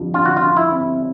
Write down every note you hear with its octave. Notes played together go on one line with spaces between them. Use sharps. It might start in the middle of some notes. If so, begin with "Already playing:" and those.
Already playing: F2 D3 G3
D3 F4
F#4
F4
D3
E4
C4